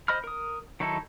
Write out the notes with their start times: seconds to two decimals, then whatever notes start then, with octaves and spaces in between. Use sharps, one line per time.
0.08 C5 D#5 B5 F6
0.24 A#4 D#6
0.80 D#3 F#3 D#4 E4 A4